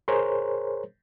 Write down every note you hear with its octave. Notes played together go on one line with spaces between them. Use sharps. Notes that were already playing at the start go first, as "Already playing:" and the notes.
G#4 A#4 C5 C#5